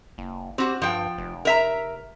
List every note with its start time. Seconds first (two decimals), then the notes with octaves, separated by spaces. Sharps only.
0.18 F#1
0.58 C4 F#4 G4
0.82 G2 F3 G5
1.18 F1
1.45 A#4 E5 A#5